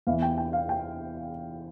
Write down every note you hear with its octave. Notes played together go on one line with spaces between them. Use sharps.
E2 E3 F5
G5
G5
F5
G5